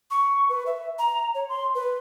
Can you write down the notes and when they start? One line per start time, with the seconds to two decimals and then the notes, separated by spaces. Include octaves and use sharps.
0.11 C#6
0.49 B4
0.66 E5
0.99 A#5
1.35 C#5
1.49 C6
1.75 B4